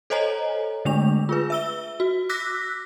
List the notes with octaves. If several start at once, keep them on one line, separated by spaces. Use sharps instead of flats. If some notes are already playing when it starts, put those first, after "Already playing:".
A4 C5 C#5 D#5 G#5 A#5
D3 G#3 A3 D4 F7
F4 G#4 B4
E5 E6 G7
F#4
D6 E6 F#6 A#6 B6